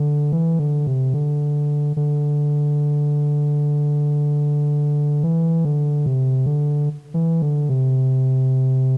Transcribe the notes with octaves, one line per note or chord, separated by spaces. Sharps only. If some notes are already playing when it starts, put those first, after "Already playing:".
Already playing: D3
E3
D3
C3
D3
D3
E3
D3
C3
D3
E3
D3
C3